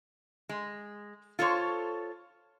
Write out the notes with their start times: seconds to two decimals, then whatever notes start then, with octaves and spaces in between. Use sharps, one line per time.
0.49 G#3
1.39 F4 A4 C5 C#5